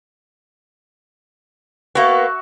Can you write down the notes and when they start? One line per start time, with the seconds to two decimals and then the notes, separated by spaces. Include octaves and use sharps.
1.95 A#3 B3 F#4 E5 C#6